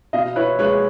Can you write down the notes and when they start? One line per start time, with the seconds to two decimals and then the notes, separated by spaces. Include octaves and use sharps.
0.13 B2 D#5 F5
0.36 E4 B4 C#5
0.59 G#3 B4 C#5